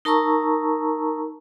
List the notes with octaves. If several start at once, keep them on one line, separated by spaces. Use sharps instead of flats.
D#4 A#4 A5 A#5 C#6 E6